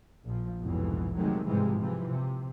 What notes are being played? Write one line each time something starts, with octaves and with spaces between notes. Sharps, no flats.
A#1 F3
F1 C2 F2 G#2 B2 E3
C3 D#3 F#3 G#3 A3
G#2 C3 E3 F3 G3 G#3
C3 E3 F3
C3